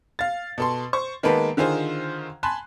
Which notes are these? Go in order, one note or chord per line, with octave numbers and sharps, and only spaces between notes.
F5 A6
B2 A4 C6
C5 C#6
D#3 G#3 A#3 B3 A4 B4
D3 D#3 F4 G#4 C5
G#5 A5 B5 C6 F#6